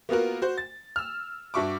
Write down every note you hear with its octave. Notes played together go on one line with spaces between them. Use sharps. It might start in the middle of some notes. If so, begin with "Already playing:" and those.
A#3 B3 F4 F#4 A#4
F#4 C5
A6
E6 F6
G2 F#4 E5 C#6 D6